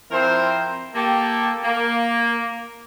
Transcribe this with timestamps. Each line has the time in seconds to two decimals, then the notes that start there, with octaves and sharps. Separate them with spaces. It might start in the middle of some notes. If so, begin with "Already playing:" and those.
0.11 F3 C4 E4 A#4 C5
0.94 A#3 G4 A4
1.64 A#3